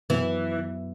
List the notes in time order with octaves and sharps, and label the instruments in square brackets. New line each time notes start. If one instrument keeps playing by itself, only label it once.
[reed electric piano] F#2 F#3 B3 [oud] E3